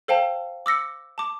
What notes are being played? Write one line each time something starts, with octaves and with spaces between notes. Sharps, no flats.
A4 C5 F5 G5 A5
D6 E6 A#6 C#7
A5 D6